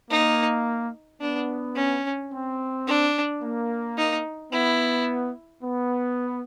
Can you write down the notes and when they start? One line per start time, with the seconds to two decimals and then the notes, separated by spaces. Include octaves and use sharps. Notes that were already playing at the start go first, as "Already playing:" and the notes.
0.11 A#3 D#4
1.21 B3 D4
1.76 C#4
2.31 C4
2.87 D4
3.43 A#3
3.97 D#4
4.52 B3 E4
5.63 B3